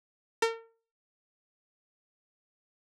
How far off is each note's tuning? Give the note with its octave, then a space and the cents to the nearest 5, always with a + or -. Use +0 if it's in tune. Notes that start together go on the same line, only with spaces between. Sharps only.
A#4 -40